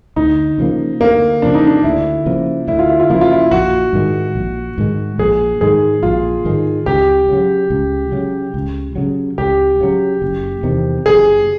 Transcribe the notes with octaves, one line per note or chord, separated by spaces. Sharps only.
D2 D#4
C#3 F3 A#3
D2 A#3
C#3 F3 A#3 D4
D#4
D4
D2 E4
C#3 F3 A#3
D2 E4
F4
E4
F4
C#3 F3 A#3 E4
F4
E4
A#1 F#4
G#2 D#3 G#3
A#1
G#2 D#3 G#3
A#1 G#4
G#2 D#3 G#3 G#4
A#1 F4
G#2 D#3 G#3
C#2 G4
C#3 F#3
C#2
C#3 F#3
C#2
C#3 F#3
C#2 G4
C#3 F#3
F#1
E2 C3 D#3
F#1 G#4